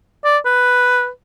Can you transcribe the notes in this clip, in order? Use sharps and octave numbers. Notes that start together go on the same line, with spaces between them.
D5
B4